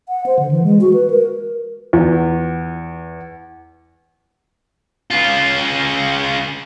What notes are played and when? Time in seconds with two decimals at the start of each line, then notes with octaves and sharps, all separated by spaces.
0.09 F#5
0.26 C5
0.39 D3
0.51 E3
0.64 G#3
0.81 F#4
0.93 B4
1.10 A#4
1.93 E2
5.11 C#3 F4